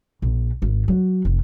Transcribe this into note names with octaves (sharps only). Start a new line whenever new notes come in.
A#1
G#1
F#3
F1